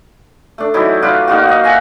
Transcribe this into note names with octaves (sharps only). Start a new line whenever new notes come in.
A3 D4
E3 F#3 D#4 E4
F4 F#4 B4 D5
A#3 D#4 F4 F#4
D#5 F5
E5 F#5 G#5 A#5